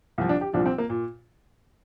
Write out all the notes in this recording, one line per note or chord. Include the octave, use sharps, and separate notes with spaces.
C2 A#2 F3
D4
G4
C2 A#2 F3 D4
C4
A#3
A#2